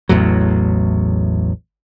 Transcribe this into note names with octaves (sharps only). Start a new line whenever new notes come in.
A1 E2 A2 F#3